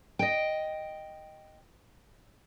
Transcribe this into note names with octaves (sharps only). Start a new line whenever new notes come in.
D#5 G5